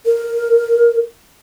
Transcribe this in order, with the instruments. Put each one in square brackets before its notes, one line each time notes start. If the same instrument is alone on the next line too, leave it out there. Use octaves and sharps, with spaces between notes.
[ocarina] A#4